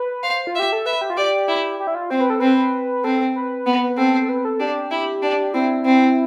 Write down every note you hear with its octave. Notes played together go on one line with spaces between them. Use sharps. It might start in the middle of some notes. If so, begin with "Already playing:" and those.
Already playing: B4
C5 F5
F4
G4 E5
A4
B4 E5
G4
F4
G4 D5
E4
G4
E4
F4
C4 C5
B4
A4
C4 B4
C4 A4
B4
B3
B4
C4 A4
A4
B4
A4
D4 G4
E4
D4
C4 E4
C4